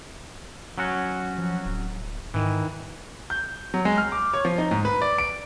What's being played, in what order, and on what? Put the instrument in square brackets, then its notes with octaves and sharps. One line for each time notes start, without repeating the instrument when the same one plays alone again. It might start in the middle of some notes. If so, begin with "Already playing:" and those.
[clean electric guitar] F#3 C#4 F#4
[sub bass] F3
D1
[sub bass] G#2 [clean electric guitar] D#3 E3
[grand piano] G6
F#3
G#3
F6
D6
C#5
F3
D#4
G#2
B4
D5
D7